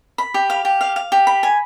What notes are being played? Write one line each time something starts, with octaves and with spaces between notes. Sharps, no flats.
B5
G4
F5
G4
F5
F5
G4
B5
G#5